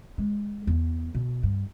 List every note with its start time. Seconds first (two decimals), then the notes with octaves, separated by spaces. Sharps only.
0.18 G#3
0.67 E2
1.14 B2
1.43 G2